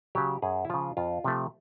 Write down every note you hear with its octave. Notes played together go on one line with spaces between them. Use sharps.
C#3 F#3 G4
F#2 G#4
E4
C#3 F3 F4
F2 F4
C3 F3 A3